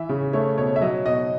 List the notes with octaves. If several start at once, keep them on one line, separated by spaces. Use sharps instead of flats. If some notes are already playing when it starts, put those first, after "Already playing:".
Already playing: E3 E5
C#3
A3 C#5
B2 C#5
E5
F#3 D#5
B2 D#5